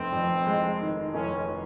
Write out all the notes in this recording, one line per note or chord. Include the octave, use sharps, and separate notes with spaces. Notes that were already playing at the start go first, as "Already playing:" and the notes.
Already playing: F1 C4
F2
G#3
D#3
F1 C#4